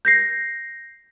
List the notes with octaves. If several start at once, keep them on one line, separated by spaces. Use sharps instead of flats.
G6 A#6 C7